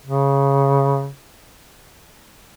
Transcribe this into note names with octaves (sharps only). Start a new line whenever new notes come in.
C#3